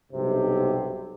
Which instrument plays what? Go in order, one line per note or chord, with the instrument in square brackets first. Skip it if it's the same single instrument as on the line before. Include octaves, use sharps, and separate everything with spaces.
[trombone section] B1 G2 C3